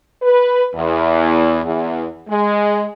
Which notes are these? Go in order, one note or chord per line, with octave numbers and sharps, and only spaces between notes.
B4
E2
E2
G#3